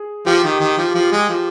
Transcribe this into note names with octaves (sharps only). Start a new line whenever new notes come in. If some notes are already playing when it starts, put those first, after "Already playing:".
Already playing: G#4
F3 G4
D#3
D#3
F3
F3
G#3
F3